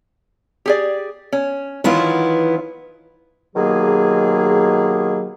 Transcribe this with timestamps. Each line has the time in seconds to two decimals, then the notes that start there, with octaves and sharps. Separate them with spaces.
0.66 G4 G#4 D5
1.33 C#4
1.84 D#3 E3 F#3 B3 E4 F4
3.56 B2 D#3 F#3 A#3 G4 G#4